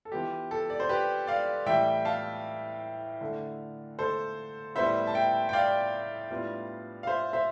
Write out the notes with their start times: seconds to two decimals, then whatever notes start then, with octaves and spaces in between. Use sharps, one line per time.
0.05 A4
0.12 E3 B3 F4 G4
0.51 A4
0.70 D5
0.80 C5
0.89 G4 B4
1.27 D5 F5
1.66 A2 E3 G3 E5 G5
2.05 F5 A5
3.21 D3 A3 E4
3.99 A4 C5
4.75 A2 G3 B3 C5 E5
5.07 A5
5.14 E5 G5
5.49 G5
5.53 D5 F5
6.30 A2 G3 B3 D4 F4
7.03 F5
7.07 C5 E5
7.33 C5 E5